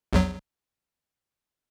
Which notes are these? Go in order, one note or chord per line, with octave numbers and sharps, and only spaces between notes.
A#1 E2 F#3